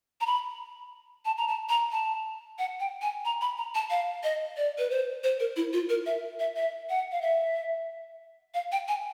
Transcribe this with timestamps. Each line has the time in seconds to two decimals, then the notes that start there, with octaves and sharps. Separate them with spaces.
0.21 A#5
0.26 B5
1.25 A5
1.37 A#5
1.48 A5
1.69 A#5
1.92 A5
2.59 F#5
2.80 G5
3.02 G#5
3.25 A#5
3.41 B5
3.58 A#5
3.75 A5
3.90 F5
4.23 D#5
4.57 D5
4.78 B4
4.90 C5
5.23 C5
5.40 A#4
5.56 E4
5.73 F4
5.89 A#4
6.06 E5
6.40 E5
6.56 E5
6.90 F#5
7.12 F5
7.22 E5
8.54 F5
8.72 G5
8.88 G#5